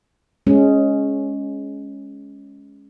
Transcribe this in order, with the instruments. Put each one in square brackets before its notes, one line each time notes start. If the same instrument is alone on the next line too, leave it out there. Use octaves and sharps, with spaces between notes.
[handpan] G#3 C#4